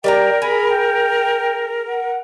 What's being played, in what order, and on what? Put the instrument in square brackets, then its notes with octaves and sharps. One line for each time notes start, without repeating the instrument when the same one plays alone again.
[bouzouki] G3 D5 A#5 [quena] A#4 [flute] G5
[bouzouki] G#4 [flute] B5
[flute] G5
F#5